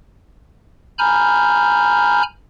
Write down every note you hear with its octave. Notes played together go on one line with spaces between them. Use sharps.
G#5 A#5 B5 F6 G6